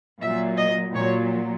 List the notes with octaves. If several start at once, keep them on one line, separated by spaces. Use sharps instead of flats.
A#2 F#3 E5
D#5
A#2 F#3 C#5